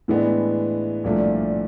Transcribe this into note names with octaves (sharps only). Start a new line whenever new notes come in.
A2 E3 G#3 B3 D4
C2 A#2 F3 A3 D4